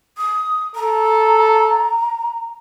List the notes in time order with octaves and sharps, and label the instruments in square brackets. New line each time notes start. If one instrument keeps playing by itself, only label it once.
[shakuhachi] D#6
[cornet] A4 [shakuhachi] A#5